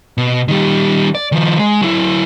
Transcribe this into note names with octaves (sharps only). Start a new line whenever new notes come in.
B2
D#3 G3
D5
D#3 F3
G#3
F#3 E4